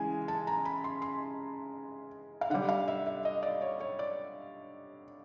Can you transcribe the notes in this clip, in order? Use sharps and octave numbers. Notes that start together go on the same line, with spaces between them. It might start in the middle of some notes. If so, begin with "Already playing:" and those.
Already playing: C#3 E3 G#3 G#5
A5
A#5
B5
C6
C6
F5
D3 G3 F#5
F5
E5
E5
D#5
D5
C#5
C#5
D5